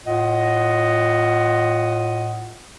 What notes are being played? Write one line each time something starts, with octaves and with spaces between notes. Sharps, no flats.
A2 F4 D#5 F#5